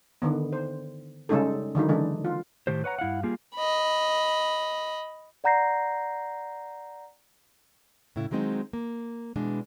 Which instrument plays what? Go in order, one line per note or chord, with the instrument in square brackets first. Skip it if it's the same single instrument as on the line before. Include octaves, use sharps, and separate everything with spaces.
[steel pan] D3 D#3 B3
C5
C#3 G3 G#3 C#4 D#4 A4
D3 D#3 F#3 D#4
C#3 E3 G#3 D4
F4
[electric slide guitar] A2 D#3 A3 G4 C5
B4 C#5 F#5 A#5
G2 E4 F5 F#5
G3 A#3 F4 G#4
[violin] D#5 B5
[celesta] D5 F#5 A#5 G6 A#6 C7
[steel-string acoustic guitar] A2 C#3 E4
D#3 F#3 G#3 C4 D#4
A#3
B2 E3 G#3 D4